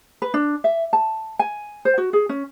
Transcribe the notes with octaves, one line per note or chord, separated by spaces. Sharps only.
B4
D4
E5
A5
G#5
C5
F#4
G#4
C#4